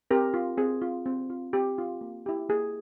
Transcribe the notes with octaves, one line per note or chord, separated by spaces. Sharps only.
C4 G4 A#4
F4
C4 G#4
F4
C4
F4
C4 G4
F4
A#3
E4 G4
A#3 G#4